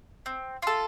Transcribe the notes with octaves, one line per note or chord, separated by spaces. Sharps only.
C4
F4 A4